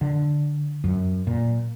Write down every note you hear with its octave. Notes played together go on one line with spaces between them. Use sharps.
D3
F#2
A#2